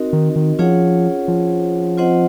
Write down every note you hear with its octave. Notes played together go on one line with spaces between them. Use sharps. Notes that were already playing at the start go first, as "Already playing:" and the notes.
Already playing: C4 D#4 F#4 A#4 D#5
D#3
D#3
F3 C#4 F4 G#4 C#5 F#5
F3
C4 F4 C5 D#5 F#5